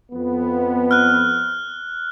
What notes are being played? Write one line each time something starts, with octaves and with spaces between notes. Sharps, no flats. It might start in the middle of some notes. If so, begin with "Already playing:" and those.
F2 B3
F6 F#6